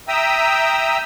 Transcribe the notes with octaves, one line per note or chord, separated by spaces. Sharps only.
E5 G5 A#5 D#6 E6